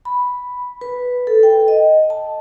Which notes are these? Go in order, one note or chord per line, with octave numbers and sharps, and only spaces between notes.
B5
B4
A4
G5
D#5
A5